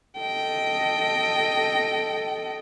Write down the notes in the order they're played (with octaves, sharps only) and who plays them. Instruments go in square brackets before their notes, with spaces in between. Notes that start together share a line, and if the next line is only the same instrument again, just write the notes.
[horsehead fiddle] A4 D#5 [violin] G5